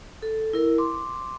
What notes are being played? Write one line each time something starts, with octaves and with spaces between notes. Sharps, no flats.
A4
E4 A#4
C6 D6